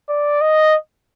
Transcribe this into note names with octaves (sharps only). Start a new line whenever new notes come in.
D5
D#5